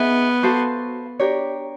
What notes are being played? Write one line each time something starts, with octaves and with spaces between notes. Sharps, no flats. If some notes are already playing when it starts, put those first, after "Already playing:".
Already playing: B3 D#4 G#4 E5
F#4 A4 C5 F5
D4 G4 A#4 C#5